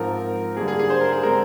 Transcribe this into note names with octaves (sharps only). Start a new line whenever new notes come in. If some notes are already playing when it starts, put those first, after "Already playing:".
Already playing: G#2 F3 C4 A#4
G2 D3 G3 A#3 G#4
G#4
G#4
C5
A#4
G#4
D3 G#3 C4 A#4